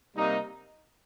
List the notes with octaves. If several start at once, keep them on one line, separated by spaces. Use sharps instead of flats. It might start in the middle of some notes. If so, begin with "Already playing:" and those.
C3 G3 A#3 D#4